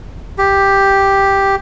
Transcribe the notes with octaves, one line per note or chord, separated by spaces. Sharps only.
G4